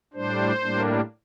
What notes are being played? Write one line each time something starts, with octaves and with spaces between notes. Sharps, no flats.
A2 G3 D4 C5
A2 G3 A#3 D4